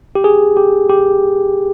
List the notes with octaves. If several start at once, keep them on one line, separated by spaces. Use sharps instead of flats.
G4
G#4
G4
G4